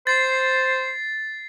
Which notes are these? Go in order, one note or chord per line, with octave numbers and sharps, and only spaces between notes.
C5 A6 C7